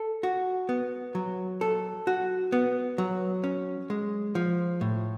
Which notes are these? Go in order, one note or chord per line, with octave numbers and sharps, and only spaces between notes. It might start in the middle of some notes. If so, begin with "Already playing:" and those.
Already playing: A4
F#4
B3
F#3
A4
F#4
B3
F#3
C#4
G#3
F3
A2